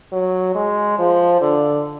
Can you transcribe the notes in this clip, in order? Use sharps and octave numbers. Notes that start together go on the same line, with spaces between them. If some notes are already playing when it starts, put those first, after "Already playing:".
F#3
G#3
F3
D3